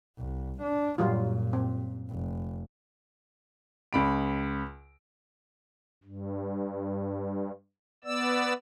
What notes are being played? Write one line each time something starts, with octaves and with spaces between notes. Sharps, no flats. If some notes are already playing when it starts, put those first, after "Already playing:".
C2
D4
F#2 A#2 F#3 G3 F4
C4
F1
C#2 B5 D7
G2
B3 D5 E6